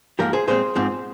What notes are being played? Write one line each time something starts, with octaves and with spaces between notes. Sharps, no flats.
G#2 F3 A#3 G4 A#4
G#4 C5
A#2 G#3 C4 G#4 C5
G#2 F3 C4